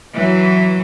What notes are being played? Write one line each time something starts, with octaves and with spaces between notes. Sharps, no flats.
E3 F#3